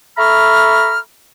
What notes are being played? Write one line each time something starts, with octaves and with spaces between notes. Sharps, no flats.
A4 E5 A#5 B5 C#6 F6